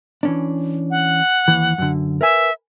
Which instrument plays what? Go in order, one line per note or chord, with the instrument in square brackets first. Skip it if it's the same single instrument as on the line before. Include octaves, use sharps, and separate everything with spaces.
[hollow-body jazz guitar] E3 C#4 D4
[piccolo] F#5
[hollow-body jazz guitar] D#2 E3
F#2 D3
[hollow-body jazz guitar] A#4 B4 G#5 [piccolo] E5